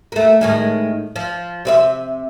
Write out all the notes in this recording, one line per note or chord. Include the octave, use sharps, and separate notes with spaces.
A3 A#3
A2 D#3 G#3
F3
C3 C4 E5